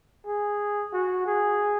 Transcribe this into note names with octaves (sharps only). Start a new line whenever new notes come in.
G#4
F#4
G#4